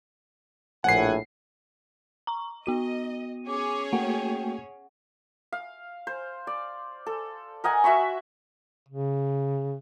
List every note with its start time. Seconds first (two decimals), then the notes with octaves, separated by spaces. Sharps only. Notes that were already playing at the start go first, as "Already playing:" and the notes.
0.84 A#1 A2 F#5 G#5 C7
2.27 A#5 C#6
2.66 B3 F#4 D#5 D#7
3.48 C#4 G#4 C#5 D6
3.93 A3 A#3 F#4 F#5 G5
5.52 F5
6.07 C5
6.47 D5
7.07 A4
7.64 A#4 D#5 F#5 G#5
7.84 F#4 E5 B5 C#6
8.89 C#3